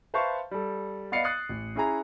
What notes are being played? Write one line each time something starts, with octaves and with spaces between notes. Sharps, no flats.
B4 C5 E5 F5 A5 C#6
G3 A4
B3 D5 D#5 F5 C7 C#7
D#6 F#6 A6 C7 C#7
A1
C#4 E4 G#4 G#5 A#5